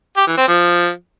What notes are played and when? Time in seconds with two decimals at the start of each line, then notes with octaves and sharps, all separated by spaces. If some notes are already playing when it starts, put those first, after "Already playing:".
0.17 G4
0.27 E3
0.37 C4
0.48 F3